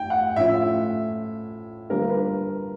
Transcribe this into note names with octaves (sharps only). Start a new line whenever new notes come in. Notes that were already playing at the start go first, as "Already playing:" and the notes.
Already playing: G5
F#5
A2 F3 A3 C#4 F4 E5
D3 G3 A#3 D4 F4 A#4
B4